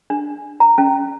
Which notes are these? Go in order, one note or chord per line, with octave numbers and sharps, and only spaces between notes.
D4
A#5
C#4